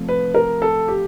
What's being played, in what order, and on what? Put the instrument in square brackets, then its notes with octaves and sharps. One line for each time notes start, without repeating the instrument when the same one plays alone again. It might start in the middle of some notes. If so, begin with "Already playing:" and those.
Already playing: [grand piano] C3 F3 A3
B4
A#4
A4
G4